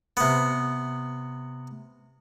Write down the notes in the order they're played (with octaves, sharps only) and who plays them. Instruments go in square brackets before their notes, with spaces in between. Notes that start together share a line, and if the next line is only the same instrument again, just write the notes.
[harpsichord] C3 B3